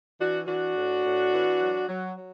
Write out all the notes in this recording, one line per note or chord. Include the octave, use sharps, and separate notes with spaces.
E3 D4 F#4
E3 D4 F#4
A2
A2
E3
F#3
F#3
F#3